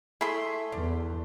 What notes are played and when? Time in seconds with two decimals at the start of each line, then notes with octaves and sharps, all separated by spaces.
0.21 A3 E4 G#4 E5 C6
0.72 E2 D4